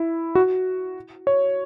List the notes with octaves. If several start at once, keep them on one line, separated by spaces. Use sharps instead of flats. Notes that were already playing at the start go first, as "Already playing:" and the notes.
Already playing: E4
F#4
C#5